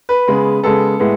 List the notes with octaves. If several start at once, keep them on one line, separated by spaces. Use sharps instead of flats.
B4
C#3 G#3 B3
C#3 G#3 B3 A4
A2 G#3 B3